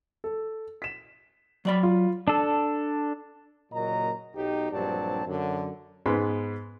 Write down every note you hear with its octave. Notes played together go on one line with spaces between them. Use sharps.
A4
B6 E7
F#3 D5 B5
F4
D4 A4
F#1 A#2 F#3 A#4 D#5 A#5
B1 D#4 G4
A#1 G2 F#3 C4 D5 A5
F#2 D3
G#2 G#3 B3 B4 B5 C6